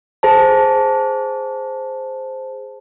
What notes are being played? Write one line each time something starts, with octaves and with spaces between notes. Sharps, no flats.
G#4 C5 A5